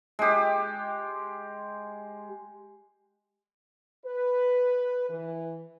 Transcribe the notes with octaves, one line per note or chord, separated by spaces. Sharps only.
G#3 G4
B4
E3